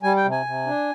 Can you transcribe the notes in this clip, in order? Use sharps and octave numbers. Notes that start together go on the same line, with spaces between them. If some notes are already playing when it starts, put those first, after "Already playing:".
G3 G#5
G5
C3
G#5
C3
D4